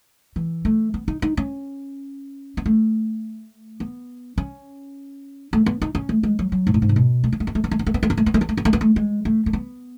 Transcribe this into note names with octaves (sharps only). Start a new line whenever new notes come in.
E3
A3
B3
D#4
D#4
C#4
B3
A3
B3
C#4
A3
B3
D#4
C#4
A3
G#3
F#3
F#3
G#2
A2
G#2
C#3
B2
A3
B3
A3
B3
A3
B3
A3
B3
A3
B3
A3
B3
A3
B3
A3
B3
A3
B3
A3
B3
A3
G#3
A3
A3
B3